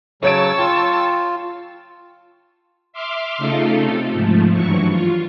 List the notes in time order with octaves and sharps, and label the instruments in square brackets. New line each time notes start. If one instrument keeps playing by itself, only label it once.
[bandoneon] C#3 F#3 [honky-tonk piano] C#5 G#6 D7 [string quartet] A5 C#6 E6
[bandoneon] F4 [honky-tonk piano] G5
[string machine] E5 C6 D6 F6
C#3 A3 D#4 F4 A4
C3 A3 A4
G#2 F3 A3
G2 E3 F#3 C#6
F4